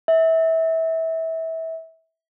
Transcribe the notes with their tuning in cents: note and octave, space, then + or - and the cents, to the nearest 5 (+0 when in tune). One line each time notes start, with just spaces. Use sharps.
E5 -25